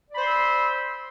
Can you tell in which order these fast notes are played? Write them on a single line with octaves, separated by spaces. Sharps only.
D5 B5 C5 C6 E6